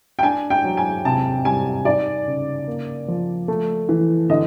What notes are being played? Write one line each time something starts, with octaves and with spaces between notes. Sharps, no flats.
G5
D4 G#5
G5
F#3
G#5
C3 A5
G3 G#5
D#4 D5
C#3
A#3
F3
A3
E3
D3 D#5